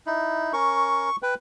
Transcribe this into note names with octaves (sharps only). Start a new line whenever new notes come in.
D#4 E4
C#4 A#4 C#6
B4 G5